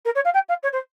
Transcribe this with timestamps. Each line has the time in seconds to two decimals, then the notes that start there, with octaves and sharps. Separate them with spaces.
0.05 A#4
0.15 C#5
0.25 F5
0.34 G5
0.49 F5
0.63 C#5
0.73 C5